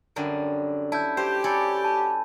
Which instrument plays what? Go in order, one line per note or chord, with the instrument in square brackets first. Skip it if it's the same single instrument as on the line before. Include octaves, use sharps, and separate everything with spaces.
[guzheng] F#2 D3 G3
[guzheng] E4 [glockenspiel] A5 G6
[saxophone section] G4 [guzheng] C5
[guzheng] A4 C#5 D5 [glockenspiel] G#5 B5
[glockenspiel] A5